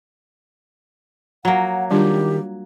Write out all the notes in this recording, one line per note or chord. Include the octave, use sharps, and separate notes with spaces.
F#3 A#3 F#5
D#3 G3 D4 F4 G4